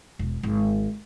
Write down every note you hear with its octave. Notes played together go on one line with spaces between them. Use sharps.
E1
G#1